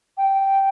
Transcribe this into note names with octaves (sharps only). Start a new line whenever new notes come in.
G5